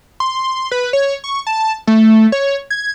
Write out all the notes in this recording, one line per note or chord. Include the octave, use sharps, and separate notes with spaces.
C6
B4
C#5
C#6
A5
A3
C#5
G#6